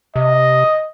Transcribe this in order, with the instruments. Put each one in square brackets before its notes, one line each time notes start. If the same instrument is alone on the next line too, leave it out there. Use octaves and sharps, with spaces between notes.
[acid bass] C3 [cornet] D#5